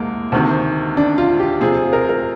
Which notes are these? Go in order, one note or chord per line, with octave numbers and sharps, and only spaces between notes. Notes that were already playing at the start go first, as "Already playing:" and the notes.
Already playing: C2 C3 G#3 A#3
D2 C3 D#3 C4
D4
F4
G4
C3 F3 C4 G#4
G#4
A#4
A#4